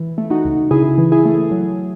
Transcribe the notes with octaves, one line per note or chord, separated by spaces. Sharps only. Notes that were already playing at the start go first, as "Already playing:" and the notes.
Already playing: E3
A3
D#4 F#4
C#2
C#3 E4 G#4
E3
E4 G#4
A3
F#3